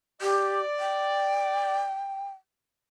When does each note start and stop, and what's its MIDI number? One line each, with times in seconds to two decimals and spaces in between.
0.22 0.60 67
0.22 1.89 74
0.79 2.30 79